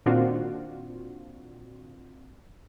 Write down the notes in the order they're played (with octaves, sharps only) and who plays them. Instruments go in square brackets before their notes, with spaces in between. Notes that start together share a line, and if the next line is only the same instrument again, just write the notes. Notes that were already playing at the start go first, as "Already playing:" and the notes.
[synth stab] A#2 D#3 C4 D4 F4 F#4